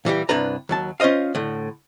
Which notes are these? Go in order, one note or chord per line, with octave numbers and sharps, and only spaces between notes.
A#2 E3 G3 G4
C2 G2 D4 B4 A#5
D#2 F#3 A5
C#4 F4 C5 D#5 F5
A2 D3